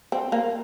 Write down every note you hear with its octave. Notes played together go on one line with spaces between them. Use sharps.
C4
A#3